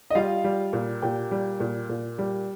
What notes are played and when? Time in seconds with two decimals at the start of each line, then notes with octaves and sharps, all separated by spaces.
0.10 D#5
0.15 G3 F4 F5
0.44 G3
0.73 A#2
1.02 A#2 G4 G5
1.31 G3
1.60 A#2
1.89 A#2
2.18 G3